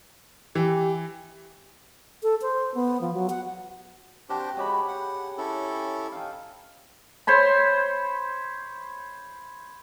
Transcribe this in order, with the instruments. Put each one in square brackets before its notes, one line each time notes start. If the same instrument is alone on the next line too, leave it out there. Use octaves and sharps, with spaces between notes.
[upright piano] E3 [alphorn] G4
[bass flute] A4
C5
B3
F3
F#3
F#5
[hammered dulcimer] C3 F#4 A5 [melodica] D4 G4 C5
[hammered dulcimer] C#3 G4 B5 [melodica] G#3 F#4
[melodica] F#5
C#4 E4 A4
[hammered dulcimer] D#3 F5
C5 C#5 B5 C6